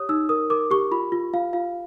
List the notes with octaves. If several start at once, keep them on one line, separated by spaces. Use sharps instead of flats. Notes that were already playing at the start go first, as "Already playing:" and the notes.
Already playing: G4 C#5 D#6
D#4 E6
A#4 D#6
A#4 D6
G4 C#6
F4 B5
F4
F4 F5
F4 F5